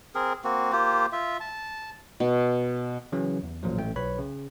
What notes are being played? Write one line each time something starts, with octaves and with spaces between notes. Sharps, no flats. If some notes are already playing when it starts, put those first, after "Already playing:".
C4 G#4 A#4
A#3 C4 F#4
A#3 F4 G4 C5
F4 E5
A5
B2
C#3 E3 F#3 C#4
E2
A1 A#2 F3 F#3
A1 A3 G5
B1 B4 C#5 B5
C#3